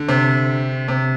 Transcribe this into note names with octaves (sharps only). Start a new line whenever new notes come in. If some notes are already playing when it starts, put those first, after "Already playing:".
Already playing: D3
C3
C3